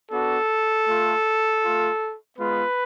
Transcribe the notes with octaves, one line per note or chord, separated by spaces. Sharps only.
B3 D4 F#4 A4
A3 F4
A3 F4
G#3 B3 F4 B4